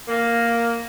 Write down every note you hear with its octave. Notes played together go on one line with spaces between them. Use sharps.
A#3